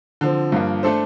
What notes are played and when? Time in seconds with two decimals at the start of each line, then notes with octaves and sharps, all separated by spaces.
0.21 D3 F3 C4
0.52 G2 F3 A#3
0.83 A3 D4 A4 C5